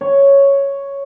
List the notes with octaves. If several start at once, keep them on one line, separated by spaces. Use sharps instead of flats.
C#5